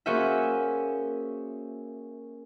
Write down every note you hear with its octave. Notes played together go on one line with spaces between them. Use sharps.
A#3 C#4 F#4 G#4 C5 E5